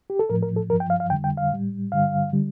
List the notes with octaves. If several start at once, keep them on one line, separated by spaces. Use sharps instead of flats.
G4
A4
A2 F3 A#4
A#4
A4
G2 F3 A#4
G5
F5
F5
F2 D3 G3 G5
G5
F5
A2 G3
G2 D3 G3 F5
D3 G3